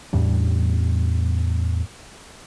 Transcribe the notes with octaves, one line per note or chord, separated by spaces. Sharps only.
E2 A2 G3 D4